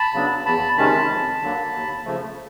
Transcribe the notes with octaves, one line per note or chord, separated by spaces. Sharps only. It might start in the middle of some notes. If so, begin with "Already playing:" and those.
Already playing: A5 B5
C#3 F#3 B3 D4
E2 A5 B5
C3 D#3 G#3 C#4 A5 B5
F2
D3 F#3 A#3
D#2
C#3 F3 A3